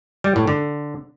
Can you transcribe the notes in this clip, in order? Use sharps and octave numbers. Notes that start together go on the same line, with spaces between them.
G3
A2
D3